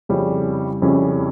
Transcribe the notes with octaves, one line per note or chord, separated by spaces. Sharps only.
F2 C#3 G3 C#4 E4
F2 C#3 G3 C#4 E4